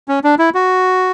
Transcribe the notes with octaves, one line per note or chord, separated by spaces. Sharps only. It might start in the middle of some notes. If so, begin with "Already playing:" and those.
C#4
D4
E4
F#4